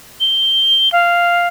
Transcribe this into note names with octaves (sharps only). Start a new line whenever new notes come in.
G7
F5